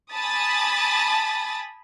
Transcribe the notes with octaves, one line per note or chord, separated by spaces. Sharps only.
G#5 A5 B5 D6 D#6 A6